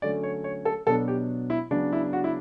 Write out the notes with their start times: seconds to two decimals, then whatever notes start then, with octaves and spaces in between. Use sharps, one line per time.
0.02 D3 F#3 A3 C#4 D5
0.23 C#5
0.44 C#5
0.65 A4
0.87 B2 F#3 B3 D4 A4
1.08 G4
1.50 E4
1.71 C#3 F#3 B3 D4
1.93 E4
2.13 F#4
2.24 E4